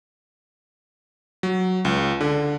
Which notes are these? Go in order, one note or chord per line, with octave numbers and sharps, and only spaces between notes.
F#3
C#2
D3